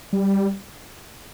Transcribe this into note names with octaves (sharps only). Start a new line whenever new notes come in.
G3